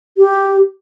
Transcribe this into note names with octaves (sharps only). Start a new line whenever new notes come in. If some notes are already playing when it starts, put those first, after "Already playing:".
G4